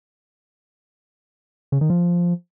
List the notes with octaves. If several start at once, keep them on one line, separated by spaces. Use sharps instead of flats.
C#3
D#3
F3